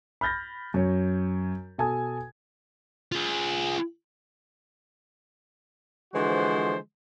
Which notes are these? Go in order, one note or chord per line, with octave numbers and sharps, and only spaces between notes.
B5 F6 G6 A6 A#6
F#2 C#5
B2 A4 G#5 A5 D#6 G#6
F4 G#4
D3 E3 F3 G#3 F#4 C5